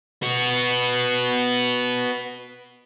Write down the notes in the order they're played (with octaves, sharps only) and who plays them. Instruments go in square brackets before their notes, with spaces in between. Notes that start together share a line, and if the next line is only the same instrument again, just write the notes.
[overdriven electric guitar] B3 F#4